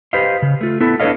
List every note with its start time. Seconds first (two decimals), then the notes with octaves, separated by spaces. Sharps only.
0.13 G4 B4 C5 D#5 F5
0.42 C#3
0.61 A3 F4
0.80 B3 E4 A4
1.00 D4 A4 B4 C#5 D#5 F5